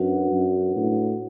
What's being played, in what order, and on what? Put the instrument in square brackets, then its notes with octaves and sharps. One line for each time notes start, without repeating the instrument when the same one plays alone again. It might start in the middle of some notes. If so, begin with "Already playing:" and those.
Already playing: [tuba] F#2 [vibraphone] D4 F#4 B4 F#5
[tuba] F#2
A2